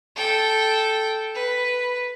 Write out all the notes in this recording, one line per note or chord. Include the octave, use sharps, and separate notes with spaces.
A4 G5
B4